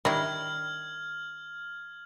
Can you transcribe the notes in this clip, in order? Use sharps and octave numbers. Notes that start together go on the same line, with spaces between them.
D#3 G3 D4 E4 A#4 F6 G#6 F#7